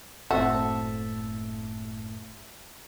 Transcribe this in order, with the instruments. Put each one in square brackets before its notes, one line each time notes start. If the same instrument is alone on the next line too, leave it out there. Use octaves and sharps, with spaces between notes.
[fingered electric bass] F#1 A2 [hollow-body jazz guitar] C4 A4 [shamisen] F#4 [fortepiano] E5 A5 E6